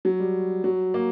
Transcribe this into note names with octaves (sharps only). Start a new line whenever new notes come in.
F#3
G3
F#3
A#3